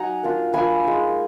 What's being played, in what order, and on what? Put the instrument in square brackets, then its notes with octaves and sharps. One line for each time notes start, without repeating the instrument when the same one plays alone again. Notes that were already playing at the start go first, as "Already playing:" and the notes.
Already playing: [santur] F#3 D#4 F#5 G#5 A#5
A#3 D4 F4
F3 A#3 D4 F4 G#5 B5
G#3 D#4